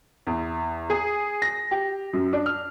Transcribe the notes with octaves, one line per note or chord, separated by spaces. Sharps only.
E2
G#4
A#6
G4
F#2
D4
F6